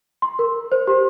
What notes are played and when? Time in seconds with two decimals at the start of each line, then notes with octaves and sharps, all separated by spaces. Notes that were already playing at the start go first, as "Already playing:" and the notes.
0.22 C6
0.39 A#4
0.72 C5
0.87 G4